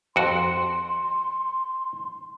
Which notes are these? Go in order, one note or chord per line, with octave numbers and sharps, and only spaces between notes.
F2 F#4 C6